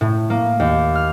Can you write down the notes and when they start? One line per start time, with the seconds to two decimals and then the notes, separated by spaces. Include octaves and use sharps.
0.01 A2
0.30 A#3
0.60 D#2
0.95 F6